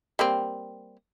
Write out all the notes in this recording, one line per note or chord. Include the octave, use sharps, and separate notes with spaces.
G3 A#3 C4